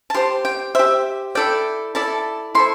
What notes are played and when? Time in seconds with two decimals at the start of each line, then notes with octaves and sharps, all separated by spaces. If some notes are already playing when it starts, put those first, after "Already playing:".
0.10 A5
0.14 G4 C5 C6
0.45 G5
0.75 G4 C5 E5
1.35 E4 A4 D5 G5
1.95 E4 A4 D5 A5
2.55 E4 A4 C5 C6